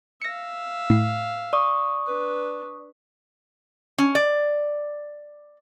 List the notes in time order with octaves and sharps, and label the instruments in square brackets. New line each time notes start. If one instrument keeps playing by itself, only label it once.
[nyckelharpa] E5 F5 [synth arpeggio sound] A#6 C#7
[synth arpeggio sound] A2 C7
[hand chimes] D5 C#6 D#6
[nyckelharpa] D4 B4
[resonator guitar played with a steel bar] C#4
D5